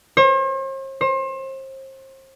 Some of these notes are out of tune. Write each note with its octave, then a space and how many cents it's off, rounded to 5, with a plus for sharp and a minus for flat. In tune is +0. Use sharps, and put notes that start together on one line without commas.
C5 +45
C5 +35